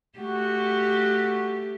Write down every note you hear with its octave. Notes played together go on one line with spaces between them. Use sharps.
A3 F#4 G4